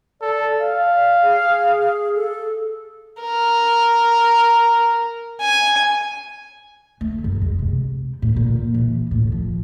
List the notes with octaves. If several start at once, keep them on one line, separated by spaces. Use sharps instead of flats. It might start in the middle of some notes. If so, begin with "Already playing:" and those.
A4 D5
F5
G#4
A4
A#4
G#5
A3
F#2
G#3
C3
A2
A#2
E3
A2
F3